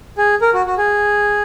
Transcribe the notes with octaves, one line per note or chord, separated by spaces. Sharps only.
G#4
A#4
F#4
F#4
G#4